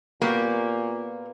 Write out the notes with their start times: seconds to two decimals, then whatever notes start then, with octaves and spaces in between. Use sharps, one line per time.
0.22 A#2 A#3 B3 F#4 G4